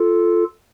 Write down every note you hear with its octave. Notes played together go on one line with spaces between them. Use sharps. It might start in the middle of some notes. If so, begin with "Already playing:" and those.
Already playing: F4 A4